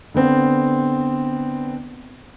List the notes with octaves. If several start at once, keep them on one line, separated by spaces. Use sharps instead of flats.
D3 B3 C4